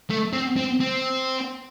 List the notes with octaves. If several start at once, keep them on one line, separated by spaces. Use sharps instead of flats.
A3
C4
C4
C4